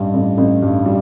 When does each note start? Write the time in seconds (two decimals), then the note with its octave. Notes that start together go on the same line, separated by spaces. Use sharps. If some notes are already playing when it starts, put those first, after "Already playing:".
Already playing: A1 G2 G3
0.14 A1
0.38 A1
0.62 G2
0.86 G3